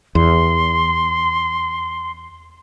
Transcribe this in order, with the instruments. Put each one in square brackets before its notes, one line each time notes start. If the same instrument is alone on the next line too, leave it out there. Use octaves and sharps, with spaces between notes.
[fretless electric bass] E2 [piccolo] C6